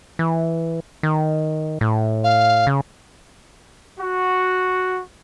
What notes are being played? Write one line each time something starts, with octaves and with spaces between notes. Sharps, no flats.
E3
D#3
A2
F5
C#3
F#4